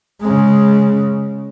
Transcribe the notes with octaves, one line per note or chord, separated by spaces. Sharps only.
C#3 G#3